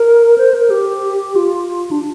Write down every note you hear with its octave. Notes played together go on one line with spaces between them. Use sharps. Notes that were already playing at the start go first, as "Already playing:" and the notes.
Already playing: A#4
C5
A#4
G4
F4
D4